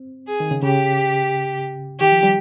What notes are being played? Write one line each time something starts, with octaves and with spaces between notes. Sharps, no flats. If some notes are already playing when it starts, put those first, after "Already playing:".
Already playing: C4
G#4
D#3
C#3
C#3 G4
D#3 G4
F3
G3